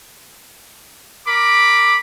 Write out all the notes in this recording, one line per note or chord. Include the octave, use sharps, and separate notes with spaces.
A#4 B5 D6